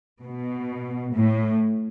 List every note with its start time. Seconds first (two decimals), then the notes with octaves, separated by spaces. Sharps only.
0.23 B2
1.14 A2